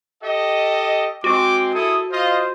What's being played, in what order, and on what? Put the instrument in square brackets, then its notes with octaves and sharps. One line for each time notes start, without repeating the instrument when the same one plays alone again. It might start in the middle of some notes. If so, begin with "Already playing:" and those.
[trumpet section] G4 A4 D#5
[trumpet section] G#3 C4 [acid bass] F#4 [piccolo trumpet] D6
[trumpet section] E4 G#4 A4 [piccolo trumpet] D#6
[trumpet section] F4 D#5 [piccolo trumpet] C5